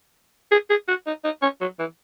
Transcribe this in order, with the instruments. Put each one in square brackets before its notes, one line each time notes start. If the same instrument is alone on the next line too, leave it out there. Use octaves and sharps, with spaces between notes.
[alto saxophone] G#4
G#4
F#4
D#4
D#4
C#4
F#3
E3